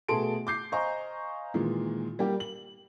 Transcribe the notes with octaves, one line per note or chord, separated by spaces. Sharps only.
B2 A3 G#4 A5 C6 D7
D6 G6 C7
C5 D#5 F5 G#5 A#5 C#6
A#2 D#3 E3 G#3
G3 A#3 G4
F#7